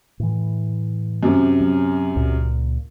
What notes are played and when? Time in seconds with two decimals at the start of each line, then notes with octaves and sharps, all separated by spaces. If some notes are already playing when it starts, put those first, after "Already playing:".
0.20 A2 E3
1.23 F#2 C3
1.60 F#3
2.16 C#2 A#2